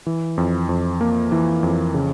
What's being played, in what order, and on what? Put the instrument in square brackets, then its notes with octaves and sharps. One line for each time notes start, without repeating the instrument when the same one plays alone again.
[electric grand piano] E3
F2
F2
A#3
E3
F2
C#3